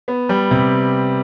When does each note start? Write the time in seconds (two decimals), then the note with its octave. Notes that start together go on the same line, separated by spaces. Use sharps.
0.08 B3
0.29 G3
0.51 C3